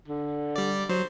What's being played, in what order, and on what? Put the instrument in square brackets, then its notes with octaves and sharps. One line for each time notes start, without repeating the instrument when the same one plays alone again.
[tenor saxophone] D3
[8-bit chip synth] G3 D5
[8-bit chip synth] F#3 [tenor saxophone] C5